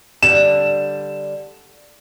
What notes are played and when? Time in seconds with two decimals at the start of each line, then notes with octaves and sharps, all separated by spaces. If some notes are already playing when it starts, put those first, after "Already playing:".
0.23 D3 G3 E7